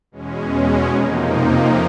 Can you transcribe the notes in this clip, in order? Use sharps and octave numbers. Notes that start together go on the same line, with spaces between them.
E2 B2 G#3 C#4
F2 C3 F3 A#3 D#4